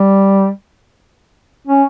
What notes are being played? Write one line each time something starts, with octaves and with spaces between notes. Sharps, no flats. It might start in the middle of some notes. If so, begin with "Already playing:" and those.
Already playing: G3
C#4